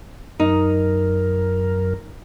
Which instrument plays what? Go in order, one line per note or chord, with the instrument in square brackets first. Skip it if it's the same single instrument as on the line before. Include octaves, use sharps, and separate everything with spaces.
[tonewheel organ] F#2 A#4 [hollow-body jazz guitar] D#4